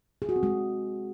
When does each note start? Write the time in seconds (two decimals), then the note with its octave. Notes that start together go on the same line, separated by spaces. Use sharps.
0.22 G#4
0.29 F#4
0.36 C4
0.43 G#3